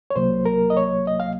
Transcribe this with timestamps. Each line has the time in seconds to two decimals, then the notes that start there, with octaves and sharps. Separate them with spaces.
0.10 C#5
0.16 C2 C3 F#3 A#3 C5
0.46 A#4
0.70 D#5
0.77 C#5
1.07 D#5
1.20 F5